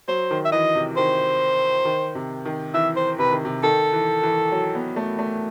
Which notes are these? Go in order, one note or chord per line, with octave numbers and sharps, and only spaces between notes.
F#3 C5
D#3
E5
E3 D#5
C3
D#3 C5
D#3
C3
D#3
E3 E5
C5
C3 B4
D#3
C3
D#3 A4
E3
E3
F#3
B3
A3
A3